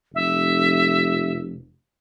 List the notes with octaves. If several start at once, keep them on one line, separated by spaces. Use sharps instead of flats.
F1 E5